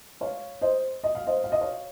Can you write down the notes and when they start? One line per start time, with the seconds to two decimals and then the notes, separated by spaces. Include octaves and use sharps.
0.21 C#5 F5
0.61 C5 D#5
1.03 D#5
1.15 F5
1.27 C5 D#5
1.44 F5
1.52 D#5
1.61 C#5 F5